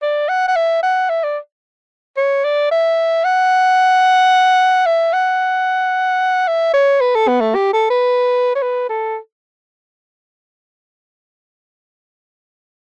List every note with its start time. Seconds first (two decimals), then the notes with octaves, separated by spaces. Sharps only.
0.02 D5
0.29 F#5
0.48 F#5
0.56 E5
0.83 F#5
1.09 E5
1.24 D5
2.17 C#5
2.44 D5
2.71 E5
3.24 F#5
4.86 E5
5.13 F#5
6.48 E5
6.74 C#5
7.01 B4
7.15 A4
7.28 B3
7.41 A3
7.55 G4
7.73 A4
7.90 B4
8.55 C#5
8.62 B4
8.89 A4